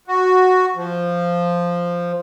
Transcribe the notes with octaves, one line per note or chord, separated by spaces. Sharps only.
F#4
F3